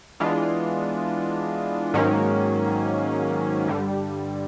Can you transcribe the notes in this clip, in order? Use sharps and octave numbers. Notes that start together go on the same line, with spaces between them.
E3 G#3 B3 D4 F4
G#2 D#3 F#3 A#3 C#4
G2 D3 G3